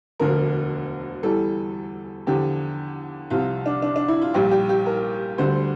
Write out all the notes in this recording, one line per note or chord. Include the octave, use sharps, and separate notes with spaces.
E1 D2 D3 F3 A#4
E2 E3 G3 A4
E2 D3 F3 G4
C2 C3 F3 F4
D4
D4
D4
E4
F4
A#1 A#2 G3 G4
G4
G4
A#4
D2 D3 G3 C5